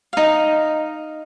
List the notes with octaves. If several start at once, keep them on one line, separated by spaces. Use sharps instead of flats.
D#4 F5